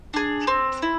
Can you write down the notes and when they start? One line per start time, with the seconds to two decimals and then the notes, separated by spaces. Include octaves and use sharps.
0.14 D4 G#4
0.47 C4
0.82 E4